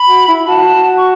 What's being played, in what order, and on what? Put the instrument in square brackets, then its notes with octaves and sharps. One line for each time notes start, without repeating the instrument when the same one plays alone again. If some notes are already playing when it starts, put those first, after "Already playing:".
Already playing: [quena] B5
[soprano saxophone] F#4
E4
[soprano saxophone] F#4 [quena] A5
[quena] C#6